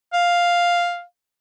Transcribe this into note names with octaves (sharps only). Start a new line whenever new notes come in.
F5